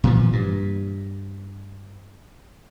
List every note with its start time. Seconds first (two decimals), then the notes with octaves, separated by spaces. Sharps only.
0.04 A#2 E3 F3
0.33 G2